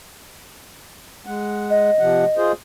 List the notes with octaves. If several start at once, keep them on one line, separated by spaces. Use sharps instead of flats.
G#3 F#5
D#5
C3 F3 F#5
F4 G#4 C5